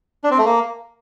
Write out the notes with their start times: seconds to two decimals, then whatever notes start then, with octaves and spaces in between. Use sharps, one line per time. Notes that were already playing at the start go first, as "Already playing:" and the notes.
0.24 D4
0.31 C4
0.38 A3
0.45 A#3